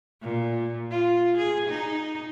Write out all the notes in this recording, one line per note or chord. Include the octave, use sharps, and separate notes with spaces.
A#2
F4
G#4
D#4